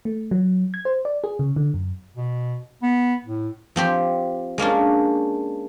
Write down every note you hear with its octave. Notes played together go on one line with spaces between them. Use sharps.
A3
F#3
G#6
C5
D5
G#4
C#3
D3
F#2
B2
B3
A2
F3 C4 G4
G#3 A#3 C#4 D4